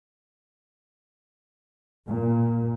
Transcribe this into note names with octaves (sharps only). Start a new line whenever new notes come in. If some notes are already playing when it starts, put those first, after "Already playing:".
A#2